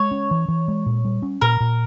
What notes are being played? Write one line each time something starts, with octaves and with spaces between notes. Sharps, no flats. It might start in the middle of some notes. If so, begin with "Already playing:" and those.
Already playing: G#3 C#5
C#4
E3
E3
G#3
A#2
G3
C#4
A#2 A#4
A#2